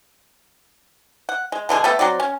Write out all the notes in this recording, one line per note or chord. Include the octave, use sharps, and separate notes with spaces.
F#5
G#3
B2 D3 G#3 G#4
A3 B3 G4 A4
F#3 C4 F#4 D5
C#4